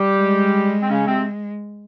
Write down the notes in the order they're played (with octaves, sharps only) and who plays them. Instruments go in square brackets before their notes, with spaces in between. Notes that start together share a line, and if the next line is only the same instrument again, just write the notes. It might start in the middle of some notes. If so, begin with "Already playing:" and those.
Already playing: [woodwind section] G3 G4
[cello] G#3
[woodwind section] C4
C#3 C#4
C3 C4